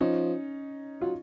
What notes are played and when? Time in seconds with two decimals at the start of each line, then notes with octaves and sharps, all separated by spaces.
0.01 F3 C#4 D#4
1.01 F#3 F4